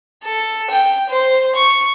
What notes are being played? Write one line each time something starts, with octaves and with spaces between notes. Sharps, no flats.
A4
G5
C5
C#6